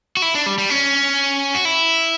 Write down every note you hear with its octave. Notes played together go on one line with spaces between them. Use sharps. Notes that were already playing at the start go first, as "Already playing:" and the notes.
F#4
E4
D4
G3
G3
C#4
F#4
E4